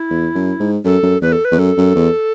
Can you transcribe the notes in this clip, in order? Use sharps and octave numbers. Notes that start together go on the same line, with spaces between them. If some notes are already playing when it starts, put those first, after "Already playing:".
Already playing: E4
E2
F#2
G#2
F#2 A4
F#2
E2 B4
A4
B4
E2
F#2 A4
F#2
E2